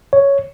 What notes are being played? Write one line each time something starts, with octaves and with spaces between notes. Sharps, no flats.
C#5